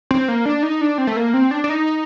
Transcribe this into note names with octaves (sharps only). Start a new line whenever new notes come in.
C4
A#3
D4
D#4
D4
C4
A3
A#3
C4
D4
D4
D#4